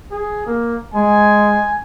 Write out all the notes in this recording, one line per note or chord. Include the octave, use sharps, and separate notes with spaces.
G#4
A#3
G#3 G#5